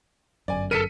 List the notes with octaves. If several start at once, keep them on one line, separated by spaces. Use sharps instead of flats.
G1 F#2 D5 G#5
A4 A#4 B6 C#7 D#7